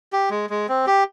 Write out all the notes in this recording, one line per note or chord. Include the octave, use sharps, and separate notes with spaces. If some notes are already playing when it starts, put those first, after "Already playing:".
G4
G#3
G#3
C4
G4